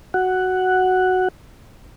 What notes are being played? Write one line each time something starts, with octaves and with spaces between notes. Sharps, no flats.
F#4 F#5